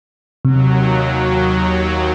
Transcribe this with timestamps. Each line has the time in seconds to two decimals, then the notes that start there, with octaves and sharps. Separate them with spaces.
0.45 D#2 C3 F#3